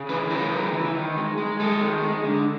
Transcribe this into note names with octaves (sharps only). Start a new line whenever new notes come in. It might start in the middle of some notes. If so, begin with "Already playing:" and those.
Already playing: C#3
E3 B4
C#3 A#4
E3
E3
D#3
G#3
G#3
G#3 A4
D#3
G#3
D3